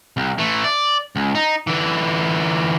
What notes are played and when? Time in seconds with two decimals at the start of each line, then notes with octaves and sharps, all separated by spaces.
0.17 C2
0.38 E3 A3
0.64 D5
1.16 C#2
1.35 D#4
1.67 D3 E3